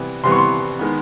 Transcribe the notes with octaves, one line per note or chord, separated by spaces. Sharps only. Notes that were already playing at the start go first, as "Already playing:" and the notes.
Already playing: C3 E3 G3 B3
C3 E3 G3 B3 C6
C#6
C6
D#3 G#3 B3